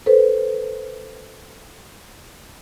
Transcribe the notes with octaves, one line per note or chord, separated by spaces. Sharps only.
A4 B4 C5